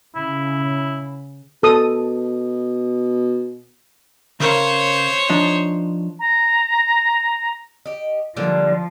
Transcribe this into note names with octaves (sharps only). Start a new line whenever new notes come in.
C#3 E4
B2 A4 D#6
C#3 A#4 C5 C#5 F5
F3 D4 D#4
A#5
G4 D#5
D3 F3 G3 A#3